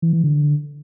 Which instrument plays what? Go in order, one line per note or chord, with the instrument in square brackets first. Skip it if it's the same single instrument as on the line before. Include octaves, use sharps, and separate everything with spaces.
[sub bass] E3
E3
D3